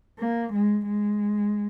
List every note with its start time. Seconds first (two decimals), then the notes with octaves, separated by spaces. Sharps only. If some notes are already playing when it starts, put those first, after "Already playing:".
0.19 A#3
0.53 G#3
0.87 G#3